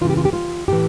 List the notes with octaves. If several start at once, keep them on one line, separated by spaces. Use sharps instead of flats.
C#3 E3 F4
G4
F4
G4
F4
A2 E3 G4